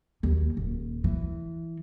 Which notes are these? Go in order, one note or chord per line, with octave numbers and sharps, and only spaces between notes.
D#2
D#1
E3